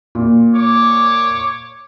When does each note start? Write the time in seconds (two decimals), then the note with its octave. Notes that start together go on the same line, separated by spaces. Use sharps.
0.15 A#2
0.54 C#5 D6